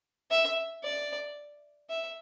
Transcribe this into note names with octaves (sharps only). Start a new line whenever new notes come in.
E5
D5
E5